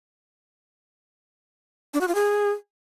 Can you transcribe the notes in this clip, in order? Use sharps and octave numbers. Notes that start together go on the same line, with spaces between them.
D4
F#4
F4
G#4